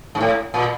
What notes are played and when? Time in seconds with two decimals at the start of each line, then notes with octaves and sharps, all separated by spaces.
0.15 G#2
0.21 A2
0.54 A#2